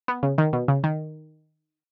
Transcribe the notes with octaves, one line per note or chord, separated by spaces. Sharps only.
B3
C#3
D#3
B2
C#3
D#3